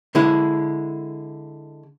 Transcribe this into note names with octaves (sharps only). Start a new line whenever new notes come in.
D3 G#3 E4